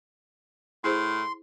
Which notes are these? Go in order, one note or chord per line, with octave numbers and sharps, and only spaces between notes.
A2 E4 G#4 C5 C6